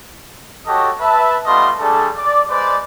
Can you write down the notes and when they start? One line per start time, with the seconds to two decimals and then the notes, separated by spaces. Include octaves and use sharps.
0.67 F#4 G4 A4 C#5 D#5 A5
1.01 B4 E5 A5
1.46 G3 A3 B3 F4 D#5 C6
1.79 G3 A3 D4 G#4 A4
2.17 D5
2.49 G#3 B4 C5 D5